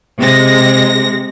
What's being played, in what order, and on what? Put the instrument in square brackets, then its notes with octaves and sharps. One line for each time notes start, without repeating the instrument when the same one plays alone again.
[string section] C3 G#3 A#6